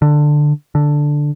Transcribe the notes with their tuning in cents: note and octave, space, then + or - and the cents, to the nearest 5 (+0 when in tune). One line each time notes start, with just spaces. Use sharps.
D3 +15
D3 +0